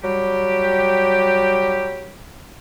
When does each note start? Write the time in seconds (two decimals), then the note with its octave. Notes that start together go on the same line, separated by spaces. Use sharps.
0.03 F#3 G3 G4